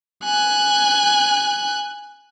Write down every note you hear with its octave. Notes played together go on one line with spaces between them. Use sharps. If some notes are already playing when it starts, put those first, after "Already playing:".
G#5 F#6